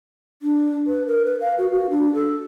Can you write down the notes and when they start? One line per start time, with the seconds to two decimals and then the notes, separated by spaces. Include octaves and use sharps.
0.42 D4
0.87 B4
1.07 A#4
1.25 B4
1.41 F5
1.58 F#4
1.73 F#4
1.90 D4
2.14 A4